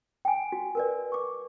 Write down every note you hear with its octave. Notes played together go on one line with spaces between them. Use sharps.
G5 G#5
F#4
A#4 B4 D5
C#6 D6